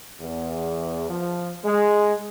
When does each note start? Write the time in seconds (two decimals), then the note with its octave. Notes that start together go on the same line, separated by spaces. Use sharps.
0.20 E2
1.09 F3
1.63 G#3